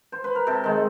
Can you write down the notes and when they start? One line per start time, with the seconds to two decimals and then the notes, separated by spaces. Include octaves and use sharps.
0.12 C5
0.24 B4
0.35 A#4
0.47 C3 A4
0.64 D#3 G#3